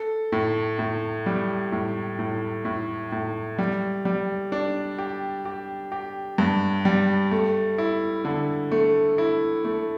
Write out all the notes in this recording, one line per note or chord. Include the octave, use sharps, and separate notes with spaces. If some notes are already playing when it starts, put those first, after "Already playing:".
Already playing: A4
A2
A2
G3
A2
A2
A2
A2
G3
G3
D4
G4
G4
G4
G2
G3
A3
E4
D3
A3
E4
A3